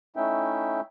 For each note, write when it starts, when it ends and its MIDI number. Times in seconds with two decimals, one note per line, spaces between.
0.16 0.81 57
0.16 0.81 61
0.16 0.81 63
0.16 0.81 64
0.16 0.81 76
0.16 0.81 79